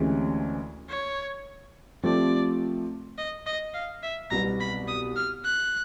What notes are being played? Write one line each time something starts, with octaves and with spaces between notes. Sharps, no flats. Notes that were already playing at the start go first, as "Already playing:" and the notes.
Already playing: D2 C3 E3 G#3 C#4
C#5
C3 F3 A3 C4 D5
D#5
D#5
F5
E5
C2 B2 F#3 B3 A#5
B5
D#6
F6
F#6